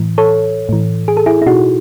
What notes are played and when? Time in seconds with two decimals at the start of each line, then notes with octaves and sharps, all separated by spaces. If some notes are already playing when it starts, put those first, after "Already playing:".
Already playing: A2 E3
0.18 A4 C#5
0.69 A2 E3
1.08 G#4
1.17 A4
1.26 E4 G#4
1.42 E4
1.46 B2 D#4 F#4